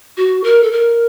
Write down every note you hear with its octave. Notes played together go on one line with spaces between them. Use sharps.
F#4
A#4
A4
A#4